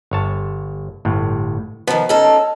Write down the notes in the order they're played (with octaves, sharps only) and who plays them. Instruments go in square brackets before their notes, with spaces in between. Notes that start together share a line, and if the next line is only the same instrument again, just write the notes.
[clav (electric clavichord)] G1 C#5 A5
G1 A2
[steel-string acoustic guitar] D#3 F3 [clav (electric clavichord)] B3
[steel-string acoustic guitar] C#4 D#4 A4